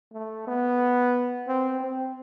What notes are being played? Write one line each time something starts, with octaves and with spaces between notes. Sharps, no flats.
A3
B3
C4
C4